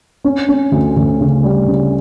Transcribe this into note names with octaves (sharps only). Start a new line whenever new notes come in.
C#4
C#4
D2
D2
C#3
G3
C#3